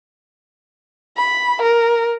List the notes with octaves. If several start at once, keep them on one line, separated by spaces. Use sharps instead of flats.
B5
A#4